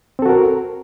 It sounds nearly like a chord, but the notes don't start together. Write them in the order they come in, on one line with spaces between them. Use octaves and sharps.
C4 A4 F#4 A#4